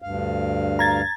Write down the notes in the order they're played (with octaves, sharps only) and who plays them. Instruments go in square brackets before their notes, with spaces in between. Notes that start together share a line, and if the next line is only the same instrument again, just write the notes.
[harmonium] D2 G2 F5
[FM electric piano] A#5 G#6 A6